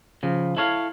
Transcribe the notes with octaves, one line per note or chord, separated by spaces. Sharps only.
C#3 F3
E4 A4 C#5 F5